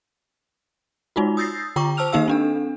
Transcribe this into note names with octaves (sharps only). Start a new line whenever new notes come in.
G#3 D#4 F4 F#4
D#6 E6 G6 A6 A#6 C7
D3 F4 G5 A#5 C#6 D6
C5 A5 E6 F6 F7
D#3 A#3 D#4 G4 F5 E6
C4 D4 A4